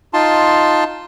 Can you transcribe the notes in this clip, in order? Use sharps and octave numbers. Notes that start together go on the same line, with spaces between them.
D#4 F4 A5 C6